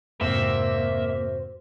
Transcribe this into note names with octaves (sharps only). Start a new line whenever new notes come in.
F2 G#2 C3 A#3 C4 F#4 C5 E5